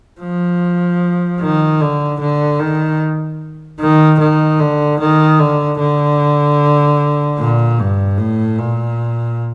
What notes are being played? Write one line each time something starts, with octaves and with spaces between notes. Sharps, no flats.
F3
D#3
D3
D3
D#3
D#3
D#3
D3
D#3
D3
D3
A#2
G2
A2
A#2